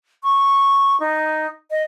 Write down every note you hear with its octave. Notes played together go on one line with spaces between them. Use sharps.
C#6
D#4
D#5